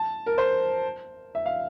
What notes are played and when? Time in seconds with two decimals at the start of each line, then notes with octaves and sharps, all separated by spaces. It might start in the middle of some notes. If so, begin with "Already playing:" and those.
Already playing: A5
0.26 A#4
0.38 C5
1.35 E5
1.46 F5